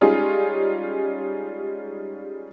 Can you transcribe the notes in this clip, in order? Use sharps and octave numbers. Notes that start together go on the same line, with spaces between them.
G3 G#3 C#4 D#4 F4 G#4